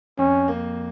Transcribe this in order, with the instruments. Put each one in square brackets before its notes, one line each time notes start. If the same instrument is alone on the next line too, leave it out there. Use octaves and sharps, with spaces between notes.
[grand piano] F2 [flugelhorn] C#4
[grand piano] A#3